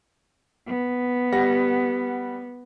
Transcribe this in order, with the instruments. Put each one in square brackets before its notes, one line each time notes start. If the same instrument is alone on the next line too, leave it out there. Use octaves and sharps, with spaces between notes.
[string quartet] B3
[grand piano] G3 F#5 A#6